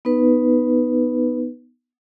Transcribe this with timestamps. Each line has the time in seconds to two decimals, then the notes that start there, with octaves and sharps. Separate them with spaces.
0.05 B3 D#4 B4